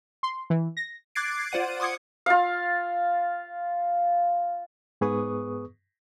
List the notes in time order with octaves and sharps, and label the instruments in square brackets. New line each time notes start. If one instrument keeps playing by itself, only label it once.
[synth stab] C6
E3
A#6
[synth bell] D6 F#6 G#6 A6 C7 D7
F4 C5 D5 F#5 D#7
C6 D6 D#6 G#6 C#7
[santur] F4 F5
[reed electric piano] G#2 B3 G#4 B4 C#6 D#6